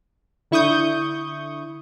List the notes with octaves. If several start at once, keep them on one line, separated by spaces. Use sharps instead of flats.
D3 E4 C#6 D#6 G6